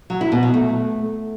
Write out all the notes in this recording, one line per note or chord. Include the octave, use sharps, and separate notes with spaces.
F#3
E4
B2
F#3
A3